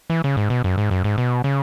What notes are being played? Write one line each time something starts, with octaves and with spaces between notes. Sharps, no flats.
E3
C#3
G#2
B2
F#2
G#2
F#2
G#2
B2
C#3